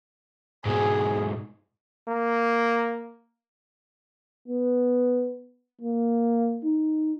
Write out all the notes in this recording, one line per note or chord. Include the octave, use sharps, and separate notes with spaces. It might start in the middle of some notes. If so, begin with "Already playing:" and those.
G#2 B2 G#4
A#3
B3
A#3
D#4